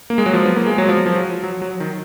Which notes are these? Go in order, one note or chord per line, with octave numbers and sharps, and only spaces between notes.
A#3
G#3
F#3
F3
B3
A#3
G#3
F#3
F3
F3
F#3
F#3
F#3
D#3